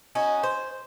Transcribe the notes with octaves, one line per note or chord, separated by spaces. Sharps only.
C#4 D#4 F#4
C5